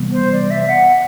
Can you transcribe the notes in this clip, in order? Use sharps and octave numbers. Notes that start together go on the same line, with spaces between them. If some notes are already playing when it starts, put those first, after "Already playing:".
Already playing: C3 E3 G3 B3
C5
D5
E5
F#5